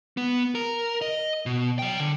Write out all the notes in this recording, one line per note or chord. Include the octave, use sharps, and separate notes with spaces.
B3
A#4
D#5
B2
F#3 G5
D3